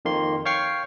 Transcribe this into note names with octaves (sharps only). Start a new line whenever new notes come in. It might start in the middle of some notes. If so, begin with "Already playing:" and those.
F2 D#3 A#3 C6
C#5 F5 G5 C#6 C7